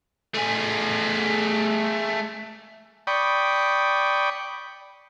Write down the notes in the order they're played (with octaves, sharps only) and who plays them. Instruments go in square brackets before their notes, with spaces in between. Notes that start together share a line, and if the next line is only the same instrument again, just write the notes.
[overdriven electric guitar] A3 G#4
[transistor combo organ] D5 G5 B5 C#6 D#6